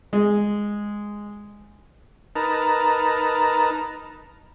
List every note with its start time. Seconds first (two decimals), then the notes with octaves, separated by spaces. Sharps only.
0.13 G#3
2.36 D#4 A#4 B4 A5 A#5